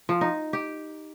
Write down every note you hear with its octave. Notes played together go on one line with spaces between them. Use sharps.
F3
D#4
G4